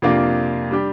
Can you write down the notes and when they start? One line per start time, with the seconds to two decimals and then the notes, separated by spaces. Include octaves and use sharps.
0.02 F2 C3 A#3 D4 F4
0.71 G3 D4 G4